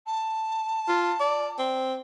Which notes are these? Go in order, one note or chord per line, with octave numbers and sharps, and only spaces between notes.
A5
F4
D5
C4